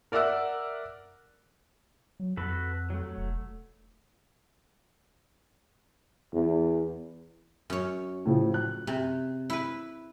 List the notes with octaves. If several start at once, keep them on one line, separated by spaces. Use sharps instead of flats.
A#4 D5 E5 F#5 E6 F#6
F#3
F2 F#4 A4 B4
F#3 A3
E1
E2
F#2 C#5
A2 C#3 F3
F#6
C3
E4 B4